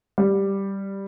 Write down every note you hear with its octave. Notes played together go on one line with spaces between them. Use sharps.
G3